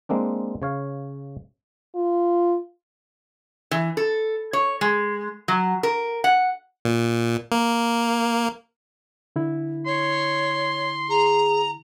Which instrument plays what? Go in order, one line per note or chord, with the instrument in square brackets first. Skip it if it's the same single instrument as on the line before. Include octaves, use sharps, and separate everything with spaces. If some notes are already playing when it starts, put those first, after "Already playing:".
[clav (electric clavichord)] G#3 A#3 C4 D4
C#3 C#5 F5
[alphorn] F4
[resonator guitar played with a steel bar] E3
A4
C#5
G#3
F#3
A#4
F#5
[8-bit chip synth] A#2
A#3
[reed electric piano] D3 E4
[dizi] C#5 [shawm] C6
[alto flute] G#4 [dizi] A#5